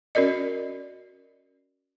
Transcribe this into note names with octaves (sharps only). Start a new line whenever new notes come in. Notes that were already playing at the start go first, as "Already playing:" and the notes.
C#4 F#4 A#4 D5 D#5